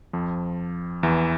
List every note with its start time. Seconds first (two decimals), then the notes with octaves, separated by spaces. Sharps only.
0.13 F2 F3
1.03 E2 E3